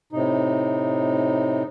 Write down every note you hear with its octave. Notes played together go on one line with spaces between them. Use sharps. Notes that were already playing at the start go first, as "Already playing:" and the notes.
A2 C3 D#4